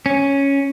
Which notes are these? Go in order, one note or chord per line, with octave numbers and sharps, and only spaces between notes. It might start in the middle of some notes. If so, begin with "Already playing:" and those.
C#4